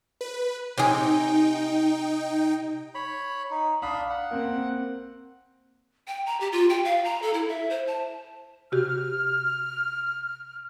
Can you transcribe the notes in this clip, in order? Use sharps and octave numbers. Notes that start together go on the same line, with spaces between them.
B4
C3 D#4 G#4 G5
C#5 B5
D#4
D4 F5 B5 D#6
F#5
A#3 C4
G5
A#5
G4
F4
G5
F5
A#5
A4
E4
E5
C5
A5
C3 F#4 G4 F6